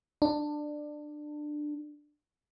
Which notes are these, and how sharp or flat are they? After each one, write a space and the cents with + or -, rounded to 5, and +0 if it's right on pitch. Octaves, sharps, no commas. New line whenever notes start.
D4 +20